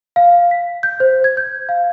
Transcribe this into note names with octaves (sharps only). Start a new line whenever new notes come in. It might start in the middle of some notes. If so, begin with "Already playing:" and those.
F5
B6
G6
C5
G#6
G6
F5